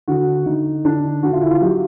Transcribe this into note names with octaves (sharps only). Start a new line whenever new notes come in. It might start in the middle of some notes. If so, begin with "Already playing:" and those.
D3 F#4
D3 D#4
D3 D4
D3 F#4
F4
E4
F4
F#3 G4